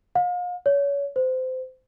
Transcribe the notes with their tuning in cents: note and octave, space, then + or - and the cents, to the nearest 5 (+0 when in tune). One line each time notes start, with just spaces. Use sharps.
F5 +40
C#5 +30
C5 -25